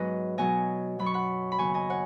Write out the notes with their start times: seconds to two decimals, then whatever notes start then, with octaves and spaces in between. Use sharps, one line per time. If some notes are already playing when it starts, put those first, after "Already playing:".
Already playing: G#2 F#3 B3 B4 D#5
0.38 B2 F#3 B3 D#5 G#5
0.99 F#2 F#3 B3 B5
1.06 C#6
1.14 F#5 B5
1.52 B5
1.58 D#2 C#3 F#3 B3 G#5 C#6
1.74 D#5 G#5
1.90 C#5 F#5